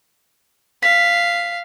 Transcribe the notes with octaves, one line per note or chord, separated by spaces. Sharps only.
F5 B6